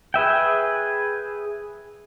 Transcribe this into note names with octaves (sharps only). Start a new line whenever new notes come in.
G#4 B4 E5 G5